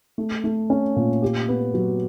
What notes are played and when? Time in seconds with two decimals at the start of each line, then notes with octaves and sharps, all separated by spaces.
0.18 A3
0.44 A3
0.70 C#4
0.96 A#2
1.22 G4
1.48 B3
1.74 F#3